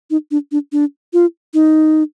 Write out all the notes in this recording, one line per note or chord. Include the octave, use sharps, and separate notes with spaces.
D#4
D4
D4
D4
F4
D#4